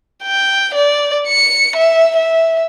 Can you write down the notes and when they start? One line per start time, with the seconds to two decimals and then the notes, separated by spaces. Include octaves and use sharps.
0.24 G5
0.75 D5
1.28 C#7
1.76 E5
2.17 E5